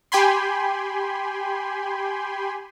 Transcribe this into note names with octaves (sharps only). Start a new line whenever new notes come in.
G4 G5 G#5 B5 C6